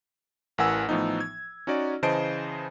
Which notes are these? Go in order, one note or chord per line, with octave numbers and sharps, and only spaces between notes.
A1 E3 A#4 F#5 G#5 E6
A2 E3 F3 B3 D#4
G#6
C#4 D#4 F#4 D5
C#3 E3 C5 D#5 A5 D7